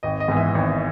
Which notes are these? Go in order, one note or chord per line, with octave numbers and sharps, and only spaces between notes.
G#1 D#5
D#5
G#2 E3 B3
E5
G#1